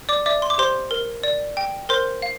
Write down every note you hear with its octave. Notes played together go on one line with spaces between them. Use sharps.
D5 D6
D5 E5 D6
C6
D6
G4 C5 C6
A#4
D5
G5
A#4 C5 C6
F5